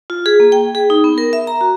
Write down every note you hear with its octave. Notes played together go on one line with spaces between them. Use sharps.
F4
G#4
A#3
G5
G#4
D#4
B3
A#4
E5
A#5
F#4